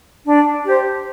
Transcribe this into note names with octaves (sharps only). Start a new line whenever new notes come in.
D4
G4 C5